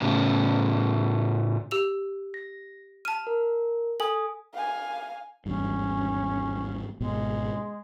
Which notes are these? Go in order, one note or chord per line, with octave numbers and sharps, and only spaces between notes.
A2 C#3
G4 E6 F7
A#6
A5 F6 D#7
A#4
A4 G#5 D#6 F#7
F5 G#5
G#1 E2 G2 C#4
G#1 B2 G#3